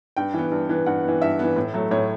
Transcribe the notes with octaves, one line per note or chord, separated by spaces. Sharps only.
G2 G5
E3 B3
G2
E3 B3
G2 F#5
E3 B3
G2 E5
E3 B3
A2
F#3 A3
A2 C#5